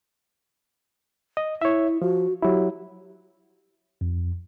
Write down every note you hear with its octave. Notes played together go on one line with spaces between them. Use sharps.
D#5
E4 C#5 E5
F3 F#4
F#3 E4 G4
F2